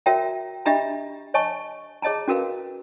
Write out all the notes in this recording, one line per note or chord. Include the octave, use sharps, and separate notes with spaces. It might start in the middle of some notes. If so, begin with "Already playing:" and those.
F#4 A#4 C#5 E5 G5 A#5
D4 G4 D#5 E5 A#5 B5
C#5 D#5 G#5 A5 C#6
G#4 C#5 D#5 A5 A#5
C#4 F#4 A#4 B4 F5